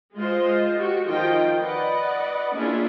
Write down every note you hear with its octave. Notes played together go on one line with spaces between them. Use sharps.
G#3 F4 C5 D#5
F#4 G4
D#3 F3 F4 D#5 G5
B4 D5 D#5 F#5
A#3 C#4 D4 E4 F4 G#4